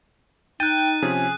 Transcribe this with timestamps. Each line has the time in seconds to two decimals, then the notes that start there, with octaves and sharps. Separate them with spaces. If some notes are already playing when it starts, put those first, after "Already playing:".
0.60 D#4 G5 F#6 A6 D#7
1.02 C3 F3 C#4 G#4